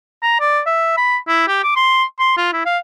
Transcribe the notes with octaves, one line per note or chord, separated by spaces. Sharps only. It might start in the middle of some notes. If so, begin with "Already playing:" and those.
A#5
D5
E5
B5
E4
G4
D6
C6
C6
F4
E4
F5